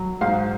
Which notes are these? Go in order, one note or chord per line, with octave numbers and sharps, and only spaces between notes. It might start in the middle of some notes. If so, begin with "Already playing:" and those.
Already playing: F#3
G#2 F5